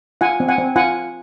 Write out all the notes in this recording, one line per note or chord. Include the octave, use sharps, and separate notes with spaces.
F4 F#5 G#5
C4
F#5 G#5
C4
F4 F#5 G#5